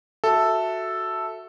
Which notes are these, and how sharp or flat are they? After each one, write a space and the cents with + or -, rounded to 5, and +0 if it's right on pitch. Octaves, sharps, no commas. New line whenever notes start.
F#4 +0 A4 +0 E5 +0